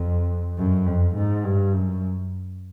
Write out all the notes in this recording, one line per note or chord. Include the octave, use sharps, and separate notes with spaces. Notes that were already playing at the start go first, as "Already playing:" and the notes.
Already playing: F2
F#2
F2
G#2
G2
F#2